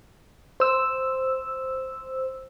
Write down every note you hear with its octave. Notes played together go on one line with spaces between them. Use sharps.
C5 E6